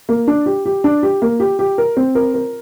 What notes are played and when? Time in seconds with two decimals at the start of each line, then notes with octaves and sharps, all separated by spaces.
0.09 A#3
0.27 D4
0.46 G4
0.66 G4
0.84 D4
1.03 G4
1.22 A#3
1.40 G4
1.59 G4
1.78 A#4
1.97 C4
2.15 A#4
2.34 A#4